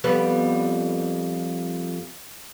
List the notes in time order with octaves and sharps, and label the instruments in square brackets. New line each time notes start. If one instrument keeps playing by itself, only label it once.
[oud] F2 G3 B3